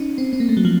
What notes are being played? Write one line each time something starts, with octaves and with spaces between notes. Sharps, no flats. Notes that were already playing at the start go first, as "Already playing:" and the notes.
Already playing: C#4 D#4
C4
C4
A#3
A3
F#3
F3